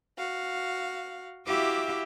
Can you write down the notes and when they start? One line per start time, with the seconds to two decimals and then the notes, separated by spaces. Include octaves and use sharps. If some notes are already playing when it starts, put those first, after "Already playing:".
0.18 F#4 F5
1.46 E4 F#4 G4 E5 F5 D6